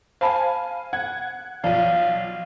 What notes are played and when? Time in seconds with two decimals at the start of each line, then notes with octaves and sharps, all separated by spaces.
0.21 C5 F5 G#5 A5 B5
0.93 F#5 G#6
1.64 B1 F3 D5 F5